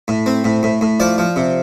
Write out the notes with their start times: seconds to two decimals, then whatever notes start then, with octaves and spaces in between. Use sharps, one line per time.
0.08 A2
0.26 C4
0.44 A2
0.63 A2
0.81 A2
1.00 F3 D5
1.18 F3
1.36 C3